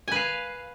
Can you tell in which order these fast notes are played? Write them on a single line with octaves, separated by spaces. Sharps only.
G#5 B4 F5